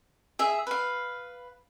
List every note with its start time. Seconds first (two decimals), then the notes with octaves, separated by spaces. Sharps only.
0.39 G#4 E5
0.67 B4 F5